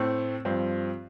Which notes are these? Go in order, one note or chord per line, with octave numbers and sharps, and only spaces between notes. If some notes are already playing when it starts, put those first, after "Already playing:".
Already playing: A2 A3 C4
G2 F3 C4